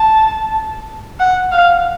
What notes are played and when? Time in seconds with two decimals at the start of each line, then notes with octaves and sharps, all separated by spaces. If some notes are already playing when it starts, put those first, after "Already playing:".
Already playing: A5
1.20 F#5
1.52 F5